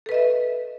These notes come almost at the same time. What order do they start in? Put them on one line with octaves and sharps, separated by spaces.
A4 B4 D#5 E5